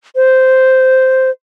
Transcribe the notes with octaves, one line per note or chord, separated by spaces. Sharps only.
C5